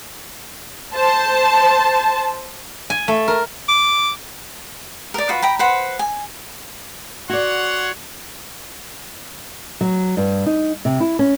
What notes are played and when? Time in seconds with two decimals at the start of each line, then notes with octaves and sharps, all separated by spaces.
0.93 C5 A5
2.90 G#5
3.08 A3
3.28 A#4
3.69 D6
5.14 A#4 D5
5.29 F4 F#4 B4
5.42 G5 A#5 B5
5.59 B4 C5 F#5
5.99 G#5
7.30 F#4 C#5 D5 F#5 C6
9.81 F#3
10.17 G2
10.46 D#4
10.85 C3
11.00 E4
11.19 C#4